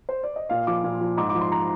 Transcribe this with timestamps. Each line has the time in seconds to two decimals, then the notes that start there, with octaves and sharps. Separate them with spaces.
0.09 C5
0.23 D5
0.36 D#5
0.50 A#2 F5
0.67 F3 D6
0.84 A#2
1.01 F3
1.17 G#2 D6
1.29 D6
1.35 F3
1.41 C6
1.52 A#5